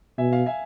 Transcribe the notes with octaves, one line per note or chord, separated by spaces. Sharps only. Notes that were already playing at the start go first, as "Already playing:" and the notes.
B2 E5 G#5
F5
E5 G#5